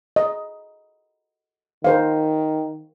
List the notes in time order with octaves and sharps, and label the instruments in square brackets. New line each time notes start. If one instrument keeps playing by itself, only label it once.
[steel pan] D#5
[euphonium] D#3 [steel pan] A#4 C5 F5